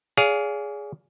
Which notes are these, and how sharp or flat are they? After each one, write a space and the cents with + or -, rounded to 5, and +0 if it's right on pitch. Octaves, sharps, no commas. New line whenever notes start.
G#4 +0 D5 -45 F5 +5